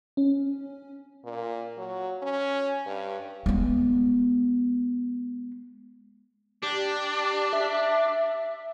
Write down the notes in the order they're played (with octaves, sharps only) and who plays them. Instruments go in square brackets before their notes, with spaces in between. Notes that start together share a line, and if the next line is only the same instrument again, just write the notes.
[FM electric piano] C#4
[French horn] A#2
F#3
C#4
G2
[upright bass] G#3 B3
[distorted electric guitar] D4 [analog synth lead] G4
[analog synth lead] E5